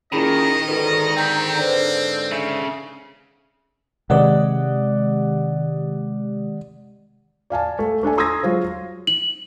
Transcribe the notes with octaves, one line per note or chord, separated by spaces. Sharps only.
A#2 D#3 C#4 E4 G#4 D#5 B5
G#2 D3 F#4 A4 B4
C4 G5 G6 B6
B4 C5 D5
C#3 E5
C3 D#3 G#3 G4 D5 D#5 F#5
D5 F5 G#5 A5
A3
A3 D4 A4 G#5
A#5 C6 D#6 E6 G#6 A#6
F#3 G#3 F4 C5
F#7